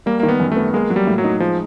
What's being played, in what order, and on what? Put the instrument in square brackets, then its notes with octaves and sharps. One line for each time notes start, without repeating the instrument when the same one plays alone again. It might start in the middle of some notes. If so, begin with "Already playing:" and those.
[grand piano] G3 [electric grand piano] A#3
[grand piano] D#3 [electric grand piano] A#3
[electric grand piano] B3
[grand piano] F#2
[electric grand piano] A3 [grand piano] B3
[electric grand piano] G#3 [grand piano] A#3
[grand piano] F#3
[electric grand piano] G3
[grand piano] A2
[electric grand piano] F#3
[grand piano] D#4
[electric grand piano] F3 [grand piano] G#3